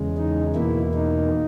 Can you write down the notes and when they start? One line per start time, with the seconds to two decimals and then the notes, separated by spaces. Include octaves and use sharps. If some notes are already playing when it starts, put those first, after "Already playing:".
Already playing: E2 C#3 G#3
0.17 D#4
0.55 E2 B2 A#3 E4
0.94 D#4